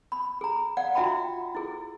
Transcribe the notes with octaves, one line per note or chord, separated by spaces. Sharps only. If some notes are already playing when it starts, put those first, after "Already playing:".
B5
G#4 A#5
D5 F5 F#5
F4 F#4 E5 G5 A#5 B5
E4 G#4